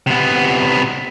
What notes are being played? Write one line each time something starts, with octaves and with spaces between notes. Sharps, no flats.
C3 B3